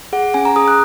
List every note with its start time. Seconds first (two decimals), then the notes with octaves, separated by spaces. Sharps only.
0.13 G#4 F#5
0.34 C#4 G#5
0.45 A#5
0.56 G#4 D#6
0.68 F#6